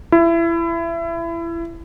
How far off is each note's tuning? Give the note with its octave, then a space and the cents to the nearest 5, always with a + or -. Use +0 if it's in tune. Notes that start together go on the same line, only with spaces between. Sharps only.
E4 +25